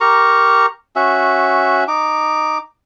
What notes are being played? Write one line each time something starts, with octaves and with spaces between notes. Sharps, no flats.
G4 A#4 A#5 C#6
C#4 F#4 E5
D#4 D6